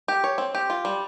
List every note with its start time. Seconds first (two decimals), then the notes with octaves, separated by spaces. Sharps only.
0.08 G4
0.24 C#5
0.38 C4
0.55 G4
0.70 F4
0.85 G3